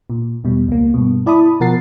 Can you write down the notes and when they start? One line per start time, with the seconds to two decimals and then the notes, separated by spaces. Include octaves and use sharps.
0.10 A#2
0.44 E2 B2 G3
0.68 C#2 A#3
0.94 G2 B2
1.26 E4 D5 A5 B5 D#6
1.60 B2 F3 A#4 F#5 A6 C7